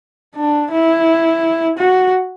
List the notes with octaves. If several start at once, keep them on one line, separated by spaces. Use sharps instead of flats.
D4
E4
F#4